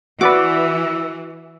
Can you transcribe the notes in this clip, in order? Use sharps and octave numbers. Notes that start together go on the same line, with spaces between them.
E3 F#4 B4 D5 D6 E6